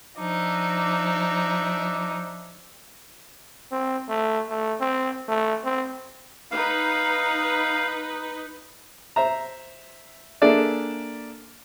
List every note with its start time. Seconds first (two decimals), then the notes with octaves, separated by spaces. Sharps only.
0.17 F3 D4 D#4 E5 D6
3.72 C4
4.09 A3
4.49 A3
4.80 C4
5.28 A3
5.64 C4
6.51 D#4 B4 F5
9.16 C5 E5 A#5
10.42 A#3 D4 G#4 A4 D5 E5